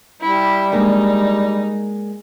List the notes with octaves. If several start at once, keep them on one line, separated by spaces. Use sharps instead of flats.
G3 E4 G4
G#3 A#3 D4 D#4